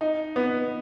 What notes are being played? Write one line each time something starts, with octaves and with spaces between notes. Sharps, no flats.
D#4
B3